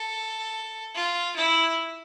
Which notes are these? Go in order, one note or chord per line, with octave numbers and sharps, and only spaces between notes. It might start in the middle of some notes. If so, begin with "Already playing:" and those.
Already playing: A4
F4
E4